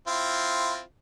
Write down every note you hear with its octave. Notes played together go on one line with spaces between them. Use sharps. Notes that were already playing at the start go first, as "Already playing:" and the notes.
C4 E4 F4